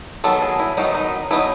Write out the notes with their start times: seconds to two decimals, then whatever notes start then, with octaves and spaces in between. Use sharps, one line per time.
0.24 D#3 F#3 B3 A4
0.42 G#4
0.60 E4
0.77 D#3 F#3 B3 D#4
0.95 D#4
1.31 F#3 B3 D#4 E4